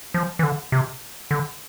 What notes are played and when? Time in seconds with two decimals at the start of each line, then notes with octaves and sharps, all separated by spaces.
0.14 F3
0.39 E3
0.43 D3
0.72 C3
1.31 D3